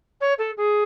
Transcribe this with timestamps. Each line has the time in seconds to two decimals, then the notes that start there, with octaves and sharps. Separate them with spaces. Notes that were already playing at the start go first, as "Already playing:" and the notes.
0.21 C#5
0.39 A4
0.57 G#4